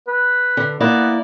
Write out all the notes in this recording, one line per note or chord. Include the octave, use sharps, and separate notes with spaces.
B4
D3
A#3 B3 E4 D5